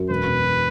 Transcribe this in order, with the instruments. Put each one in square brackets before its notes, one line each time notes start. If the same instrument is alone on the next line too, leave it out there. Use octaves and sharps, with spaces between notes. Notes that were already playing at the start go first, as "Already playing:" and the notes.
Already playing: [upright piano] F#2
[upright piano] E1 [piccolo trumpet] B4
[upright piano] B2